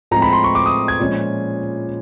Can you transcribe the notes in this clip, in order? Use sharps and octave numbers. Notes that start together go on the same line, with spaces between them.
A2 F3 G#3 C4 A#5
B5
C6
C#6
D6
D#6
G#6
A#2 F3 G#3 C#4